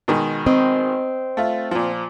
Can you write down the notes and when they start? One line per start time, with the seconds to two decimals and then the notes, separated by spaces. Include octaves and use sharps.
0.08 B2 D#3 G#3
0.46 C4 D#5
1.37 A3 F4
1.71 A#2 F3